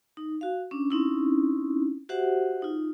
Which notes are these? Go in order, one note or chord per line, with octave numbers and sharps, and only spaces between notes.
D#4
F#4 F5
C#4 D4
C4 C#4 D#4 E4
F#4 G4 C5 E5 F#5
D#4 F4